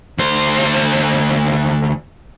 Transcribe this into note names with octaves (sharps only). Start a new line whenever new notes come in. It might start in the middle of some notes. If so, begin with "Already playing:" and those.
D2 C5